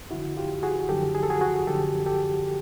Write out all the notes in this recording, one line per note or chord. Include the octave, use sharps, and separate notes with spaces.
F#2 D3 F3 E4 F#4
F4 G4
F#4 G#4
F#2 D3 F3 G4 A4
G#4
A4
F#4 G#4
F#4 G#4
F#2 D3 F3 G4 A4
G4 A4